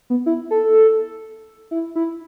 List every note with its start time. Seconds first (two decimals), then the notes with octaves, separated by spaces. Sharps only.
0.10 B3
0.26 E4
0.51 A4
1.71 E4
1.96 E4